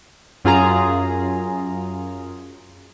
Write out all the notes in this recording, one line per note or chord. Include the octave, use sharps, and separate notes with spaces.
F#2 F4 G#4 A#5